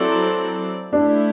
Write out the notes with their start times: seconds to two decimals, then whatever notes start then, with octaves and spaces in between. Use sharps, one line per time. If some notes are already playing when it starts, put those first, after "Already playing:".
Already playing: F#3 C4 E4 A4 D5
0.92 A3 D4 E4 G4